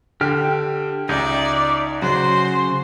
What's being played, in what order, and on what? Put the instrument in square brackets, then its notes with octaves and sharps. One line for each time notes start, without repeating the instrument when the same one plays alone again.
[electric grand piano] D3 [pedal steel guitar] G4 G5 F6
[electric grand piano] C#2 [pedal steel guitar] D#4 E5 [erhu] D5
[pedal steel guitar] C#3 F#4 [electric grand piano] F#3 [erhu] C5